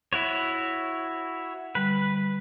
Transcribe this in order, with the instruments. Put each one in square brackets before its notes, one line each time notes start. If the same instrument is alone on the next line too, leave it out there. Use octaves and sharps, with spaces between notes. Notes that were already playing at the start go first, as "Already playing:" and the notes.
[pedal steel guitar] E4 F#4 C#5
[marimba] D3 G3 [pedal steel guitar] B4